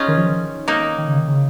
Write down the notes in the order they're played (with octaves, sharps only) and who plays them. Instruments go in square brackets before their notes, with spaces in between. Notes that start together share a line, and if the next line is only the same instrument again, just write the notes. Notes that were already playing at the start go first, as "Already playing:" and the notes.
Already playing: [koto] C#4 D#4 F4 G#4
[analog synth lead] D#3
F3
D#3
[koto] A#3 D#4
[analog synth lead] D#3
C#3
D#3
C#3